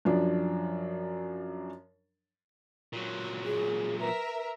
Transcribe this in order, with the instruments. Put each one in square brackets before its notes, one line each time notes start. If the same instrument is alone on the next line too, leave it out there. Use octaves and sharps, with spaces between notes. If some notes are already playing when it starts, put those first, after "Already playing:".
[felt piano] F#2 F3 D4
[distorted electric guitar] A#2 F#3
[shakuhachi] G#4
[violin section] A#4 E5 [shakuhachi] B4